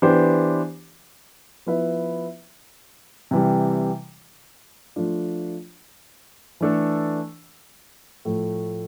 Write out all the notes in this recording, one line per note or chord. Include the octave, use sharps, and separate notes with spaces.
E3 B3 D4 G4 C5
F3 B3 E4 B4 E5
C3 E3 G3
F3 A3 D4 F4
E3 A3 D4 A4
A2 F3 A3